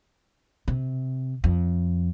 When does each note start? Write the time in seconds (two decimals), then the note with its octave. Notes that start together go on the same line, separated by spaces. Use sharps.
0.68 C3
1.44 F2